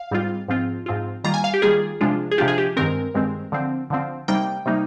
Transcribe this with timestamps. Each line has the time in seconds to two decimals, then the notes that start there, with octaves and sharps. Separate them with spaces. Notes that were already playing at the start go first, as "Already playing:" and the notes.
Already playing: F5
0.11 G#2 G3 C4 F4
0.48 G#2 F3 C4 F4
0.86 G#2 F3 C4 F4
1.24 D#3 G3 A#3 F4 A#5
1.34 G#5
1.44 F5
1.54 G4
1.62 D#3 G3 A#3 F4 G#4
2.01 C3 F3 G#3 D4 F4
2.31 G#4
2.38 C3 F3 G#3 D4 F4 G4
2.48 G#4
2.58 G4
2.76 G2 D#3 G#3 C4 A#4
3.14 G2 D#3 G#3 C4
3.52 D3 F3 C4
3.90 D3 F3 C4
4.28 C3 G3 A#3 D#4 G5
4.66 C3 G3 A#3 D#4